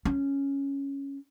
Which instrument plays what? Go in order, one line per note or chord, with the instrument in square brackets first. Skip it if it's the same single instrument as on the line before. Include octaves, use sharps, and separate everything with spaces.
[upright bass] C#4